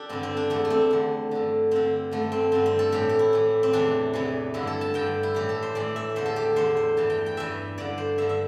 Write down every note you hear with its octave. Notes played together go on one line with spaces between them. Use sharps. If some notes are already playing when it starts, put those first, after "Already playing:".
Already playing: D4 G4 A4
G2 D3 C4
C4
D4
E2 D3 A3
A3
C4
E2 D3
G2 D3
G2 D3 C4
G2 D3 A3
C4
G2 D3 C4
C4
A4
A2 E3 G4
G4
E4
A2 E3
C4
E2 C3 E3 D4
E2 C3 E3
G2 D3 E4
A4
A5
G2 D3 G5
E4
A2 E3 G4
A4
C5
A2 E3 D5
E5
E2 D3 C5
A4
G4
E2 D3 C5
C5
G2 E3 A5
G5
G5
G2 E3 E5
G2 D3 D5
C5
G2 D3 E5
E5